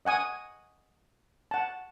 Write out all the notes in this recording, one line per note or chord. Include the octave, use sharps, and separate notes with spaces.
D#5 F#5 G#5 D#6
F#5 A5